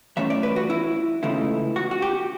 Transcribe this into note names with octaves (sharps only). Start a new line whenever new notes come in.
F#2 E3 A3 C#4 E5
D5
B4
F#4
E4
C#2 C#3 E3 A3 E4
F#4
F#4
G4